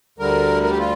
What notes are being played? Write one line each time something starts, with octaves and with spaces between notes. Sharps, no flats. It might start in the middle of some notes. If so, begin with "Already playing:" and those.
D2 D3 G3 A#4
A#4
G4
F4